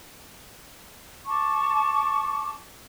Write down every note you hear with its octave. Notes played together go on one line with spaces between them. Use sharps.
A5 C#6 D6